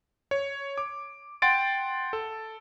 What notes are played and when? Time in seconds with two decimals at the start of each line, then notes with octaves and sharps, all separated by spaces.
0.31 C#5
0.78 D6
1.42 F#5 G5 C6 A6 D7
2.13 A4